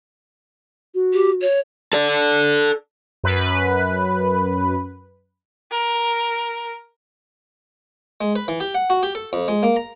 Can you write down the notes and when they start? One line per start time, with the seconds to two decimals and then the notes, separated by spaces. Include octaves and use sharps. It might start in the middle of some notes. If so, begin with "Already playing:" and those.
0.95 F#4
1.13 G4
1.42 C#5
1.93 A4 D5
3.23 F#2 B4
5.71 A#4
8.21 G#3
8.36 B4
8.48 E3
8.60 G4
8.75 F#5
8.90 F#4
9.03 G4
9.15 A4
9.33 F2
9.48 G#3
9.63 A#3
9.76 A#5